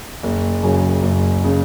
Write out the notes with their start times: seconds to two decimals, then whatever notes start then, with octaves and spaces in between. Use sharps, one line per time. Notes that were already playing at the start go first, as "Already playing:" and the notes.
0.23 F#1
0.63 F#2 C#3
1.03 F#1
1.44 C#3